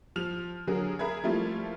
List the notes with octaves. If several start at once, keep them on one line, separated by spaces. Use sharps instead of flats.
F3 F6 F7
D3 F#3 G#4 A#4
G#4 A#4 E5 B5 G#6
F3 G3 A3 A#3 E4 F4